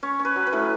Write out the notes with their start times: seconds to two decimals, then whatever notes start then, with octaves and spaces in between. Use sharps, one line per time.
0.03 C#4 C#5
0.19 C#4
0.25 B4
0.36 F#3
0.47 B4
0.53 A2